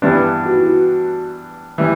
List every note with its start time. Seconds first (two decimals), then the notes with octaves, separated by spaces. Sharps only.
0.02 G2 E3 B3 D4 G4
0.45 F#4
0.56 E4
0.65 F#4
1.78 E3 G3